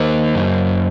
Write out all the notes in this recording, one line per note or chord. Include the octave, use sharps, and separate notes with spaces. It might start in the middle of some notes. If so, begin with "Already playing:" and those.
Already playing: D#3 A#3 C5 D#5
F#2